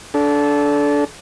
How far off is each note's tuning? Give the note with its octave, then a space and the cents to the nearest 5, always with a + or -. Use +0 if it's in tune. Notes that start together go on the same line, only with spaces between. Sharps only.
D4 -20 A4 -20